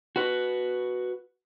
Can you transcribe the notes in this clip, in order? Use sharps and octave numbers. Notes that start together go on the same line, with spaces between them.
F#4 B4